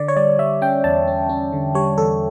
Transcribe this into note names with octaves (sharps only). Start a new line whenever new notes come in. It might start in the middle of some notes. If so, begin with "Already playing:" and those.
Already playing: D3 D5
C#5
G3 D5
G3 E5
C#4 G5
E2 A5
C#4
C#4
D3
G3 C#5
E2 A4